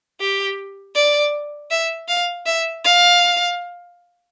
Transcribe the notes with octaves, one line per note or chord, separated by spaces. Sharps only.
G4
D5
E5
F5
E5
F5